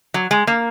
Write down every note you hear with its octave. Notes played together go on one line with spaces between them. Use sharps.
F#3
G#3
A#3